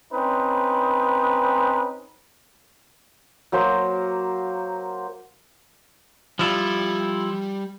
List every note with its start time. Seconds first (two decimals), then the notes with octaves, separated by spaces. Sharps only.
0.12 C4 C#4 D#4 B4
3.52 F#3 A#3 C5 A#5
6.39 F3 G3 E4 F4